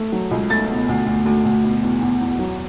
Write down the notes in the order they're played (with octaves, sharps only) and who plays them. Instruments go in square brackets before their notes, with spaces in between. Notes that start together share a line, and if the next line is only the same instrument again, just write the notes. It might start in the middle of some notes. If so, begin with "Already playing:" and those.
Already playing: [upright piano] A3
F#3
C#2
A3 A6
B2
D2
D2
D2
D2
B2
E2
E2
E2
F#3